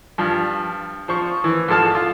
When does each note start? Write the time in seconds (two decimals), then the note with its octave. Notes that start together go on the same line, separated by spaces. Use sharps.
0.18 G2 F3
1.08 F3 C5 C#6
1.44 E3
1.68 G#2 F3 A4 A5 F6
1.95 F4